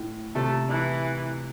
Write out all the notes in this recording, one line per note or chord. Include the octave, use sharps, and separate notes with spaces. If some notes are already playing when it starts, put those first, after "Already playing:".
Already playing: A2
C3 A3
E3